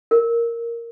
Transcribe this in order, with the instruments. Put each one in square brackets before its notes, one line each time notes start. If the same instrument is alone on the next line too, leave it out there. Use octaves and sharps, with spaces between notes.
[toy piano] A#4